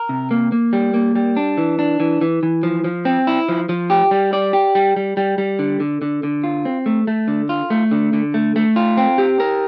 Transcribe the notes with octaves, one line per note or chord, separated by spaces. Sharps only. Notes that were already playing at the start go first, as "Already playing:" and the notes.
Already playing: A#4
C3
A#3
A#3
G3
A#3
G3
D4
E3
D4
E3
E3
E3
F3
F3
C4
E4
F3
F3
G4
G3
D5
G4
G3
G3
G3
G3
D3
D3
D3
D3
F4
C4
A3
A3
D3
F4
A3
D3
D3
A3
A3
F4
C4
G4
A#4